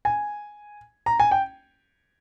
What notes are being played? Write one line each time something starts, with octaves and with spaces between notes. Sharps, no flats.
G#5
A#5
G#5
G5